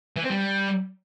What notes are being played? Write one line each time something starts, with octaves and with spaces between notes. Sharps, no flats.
E3
C4
G3